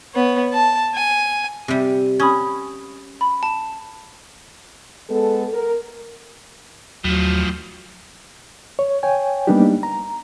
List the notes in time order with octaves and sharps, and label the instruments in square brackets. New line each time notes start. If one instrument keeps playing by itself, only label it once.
[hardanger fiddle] B3 C#5
A5
G#5
[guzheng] C3 G3
[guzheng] C#4 [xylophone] B5 D#6 G#6
[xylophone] B5
A5
[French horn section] G#3 B3 A4
A#4
[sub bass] D#2 [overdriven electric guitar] A2 F3 [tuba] F#3
[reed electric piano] C#5
C#5 G5 G#5
G3 A#3 B3 D4 D#4 G4
A#5